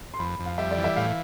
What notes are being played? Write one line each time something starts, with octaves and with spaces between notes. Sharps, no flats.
C6
F2 B5
F2
F5
G3 E5
D5
E3
E5
A2 F5